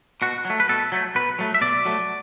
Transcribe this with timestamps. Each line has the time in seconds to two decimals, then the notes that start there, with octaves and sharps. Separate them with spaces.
0.22 B2 F#4
0.45 F#3 A3
0.60 B4
0.69 B2 A4
0.92 F#3 A3
1.15 B2 B4
1.39 F#3 A3
1.54 E5
1.61 B2 D5
1.85 F#3 A3